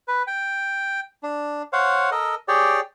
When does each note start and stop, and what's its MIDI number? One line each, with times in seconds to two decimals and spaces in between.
0.08 0.23 71
0.27 1.00 79
1.23 1.62 62
1.73 2.10 72
1.73 2.10 73
1.73 2.10 77
1.73 2.10 78
2.12 2.35 69
2.12 2.35 70
2.12 2.35 75
2.48 2.80 67
2.48 2.80 68
2.48 2.80 73
2.48 2.80 74
2.48 2.80 79